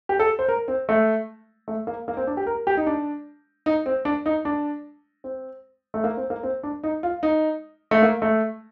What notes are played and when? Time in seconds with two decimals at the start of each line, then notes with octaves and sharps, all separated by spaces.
0.09 G4
0.19 A4
0.39 C5
0.48 A#4
0.68 C4
0.89 A3
1.68 A3
1.87 A#3
2.08 A#3
2.17 C4
2.27 D4
2.37 G4
2.47 A#4
2.67 G4
2.77 D#4
2.87 D4
3.66 D#4
3.86 C4
4.05 D4
4.26 D#4
4.45 D4
5.24 C4
5.94 A3
6.04 A#3
6.17 C4
6.30 A#3
6.43 C4
6.63 D4
6.84 D#4
7.03 F4
7.23 D#4
7.91 A3
8.02 A#3
8.22 A3